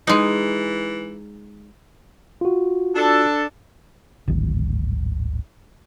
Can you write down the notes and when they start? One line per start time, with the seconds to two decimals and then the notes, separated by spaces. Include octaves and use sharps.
0.07 E3 G#3 D#4
2.41 F4 F#4
2.95 D4 A4
4.28 D1 G#1